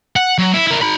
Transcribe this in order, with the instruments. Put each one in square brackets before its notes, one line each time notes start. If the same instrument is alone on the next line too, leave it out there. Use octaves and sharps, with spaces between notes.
[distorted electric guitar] F#5
F#3
E4
E4 A#4
D#4 B5